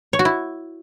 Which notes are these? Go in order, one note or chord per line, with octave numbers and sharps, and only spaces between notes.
C#5
F#4
E4